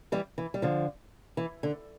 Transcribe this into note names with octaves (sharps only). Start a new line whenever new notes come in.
E3 G3
E3
G3
D3 F3
E3
D3